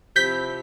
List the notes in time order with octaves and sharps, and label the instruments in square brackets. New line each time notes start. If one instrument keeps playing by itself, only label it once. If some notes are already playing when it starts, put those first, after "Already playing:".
[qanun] C3 F3 E4 [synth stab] G6 B6